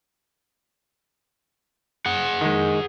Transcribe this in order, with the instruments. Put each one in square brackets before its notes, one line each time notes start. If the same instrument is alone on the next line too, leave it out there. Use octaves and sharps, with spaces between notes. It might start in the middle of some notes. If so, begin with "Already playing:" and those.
[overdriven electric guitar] G#4 F#5
[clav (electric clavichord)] D#3 G#3